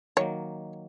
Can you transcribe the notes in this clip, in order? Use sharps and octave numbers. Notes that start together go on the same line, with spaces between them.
D#3 F#3 A#3 C#5